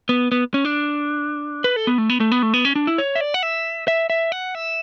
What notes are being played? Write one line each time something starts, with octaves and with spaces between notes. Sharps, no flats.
B3
B3
C#4
D4
B4
A4
B3
A3
B3
A3
B3
A3
B3
C#4
D4
E4
C#5
E5
D5
F#5
E5
E5
E5
F#5
E5